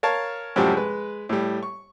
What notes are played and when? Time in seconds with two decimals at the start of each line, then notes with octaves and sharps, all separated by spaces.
0.03 A#4 C#5 F5 A5
0.56 F#2 A2 C3 F3 G3
0.74 G#3 B4
1.29 A2 G3
1.63 C#6